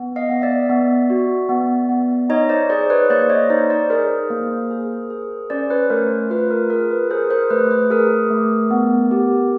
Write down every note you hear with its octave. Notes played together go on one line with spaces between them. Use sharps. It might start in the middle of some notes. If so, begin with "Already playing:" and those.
Already playing: B3
D#5 F5
B3
D5 E5
B3
F#4
B3
B3
D#4 C#5 D#5
C5 D5
G#4 C5 D5
B4 C#5
A#3 C5 D5
C#5 D#5
D#4 C5 D5
C5 D5
G#4 A#4 C5
A#3
G#4
G#4
C#4 C5 D5
B4 C#5
A3 A#4 C5
F4 B4
A#4
G#4 A#4
B4
G#4 A#4 C5
A#4 C5
A3 B4
B4
G#4 A#4
A3
B3
G4